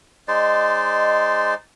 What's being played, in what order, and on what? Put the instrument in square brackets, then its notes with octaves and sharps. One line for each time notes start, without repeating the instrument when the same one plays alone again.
[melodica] G#3 D#4 C5 D5